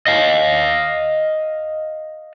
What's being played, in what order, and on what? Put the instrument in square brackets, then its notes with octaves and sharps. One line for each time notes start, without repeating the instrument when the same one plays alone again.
[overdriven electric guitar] D#5 F5